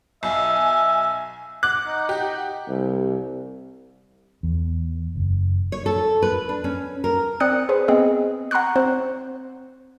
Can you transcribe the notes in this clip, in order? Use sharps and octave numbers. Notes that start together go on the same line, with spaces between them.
B1 E5 G#5
F#5 D6 F#6
D#4
G4
C2
E2
F#1
C#5
A4
B4
D4
C#4
A#4
C4 D5 G5 D#6 F#6 C#7
G#4 B4 C5
B3 C4 G#4 D#5
F#5 A#5 C6 C#6 F#6
C4 C5